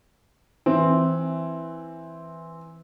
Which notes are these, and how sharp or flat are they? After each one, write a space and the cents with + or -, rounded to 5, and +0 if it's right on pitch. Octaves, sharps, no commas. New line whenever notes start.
E3 +0 C4 +0